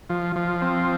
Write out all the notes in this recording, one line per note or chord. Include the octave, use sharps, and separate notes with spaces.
F3
F3
C4